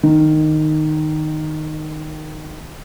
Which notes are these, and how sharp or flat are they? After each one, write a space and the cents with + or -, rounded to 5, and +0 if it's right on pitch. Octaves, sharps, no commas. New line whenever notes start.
D#3 -10